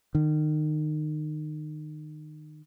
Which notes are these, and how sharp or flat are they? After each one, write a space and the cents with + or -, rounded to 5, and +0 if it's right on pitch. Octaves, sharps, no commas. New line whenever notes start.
D#3 -30